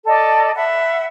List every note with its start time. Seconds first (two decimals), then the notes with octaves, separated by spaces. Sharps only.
0.07 A4 D5 D#5
0.56 E5 F#5 B5